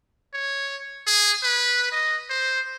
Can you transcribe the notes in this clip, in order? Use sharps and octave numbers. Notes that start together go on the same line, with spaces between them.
C#5
G#4
B4
D#5
C5